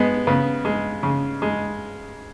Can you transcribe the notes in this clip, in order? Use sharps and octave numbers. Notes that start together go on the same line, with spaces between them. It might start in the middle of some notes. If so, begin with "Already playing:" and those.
Already playing: G#3 B3
C#3 B3
G#3
C#3
G#3